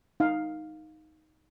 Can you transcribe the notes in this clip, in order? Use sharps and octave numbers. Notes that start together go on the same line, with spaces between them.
D#4 F5